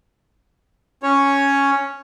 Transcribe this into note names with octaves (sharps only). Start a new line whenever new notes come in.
C#4 C#5